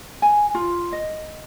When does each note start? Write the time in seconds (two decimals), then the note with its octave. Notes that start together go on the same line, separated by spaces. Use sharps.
0.22 G#5
0.55 F4
0.93 D#5